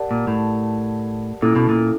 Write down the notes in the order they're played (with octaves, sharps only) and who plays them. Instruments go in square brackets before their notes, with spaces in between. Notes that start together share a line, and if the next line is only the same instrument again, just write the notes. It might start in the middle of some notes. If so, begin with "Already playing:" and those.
Already playing: [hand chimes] G4 A#4 D5 F#5 A5
[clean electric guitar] A#2
A2
[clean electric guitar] A#2 [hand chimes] C#4 E4 A4
[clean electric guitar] B2
A#2